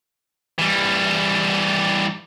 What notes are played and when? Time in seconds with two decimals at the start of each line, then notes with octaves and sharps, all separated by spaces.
0.59 E3 G3